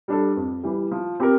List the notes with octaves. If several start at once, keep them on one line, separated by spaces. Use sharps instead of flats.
G3 D4 A4
F2
E3 G3
F3
C4 G4 A#4